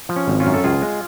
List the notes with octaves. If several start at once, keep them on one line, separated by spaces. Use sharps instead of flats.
F3
C#4
G#1
C#4 F4
F#2
A4
C#2 F4 G#4
G#3